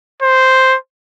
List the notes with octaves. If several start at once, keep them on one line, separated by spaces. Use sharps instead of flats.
C5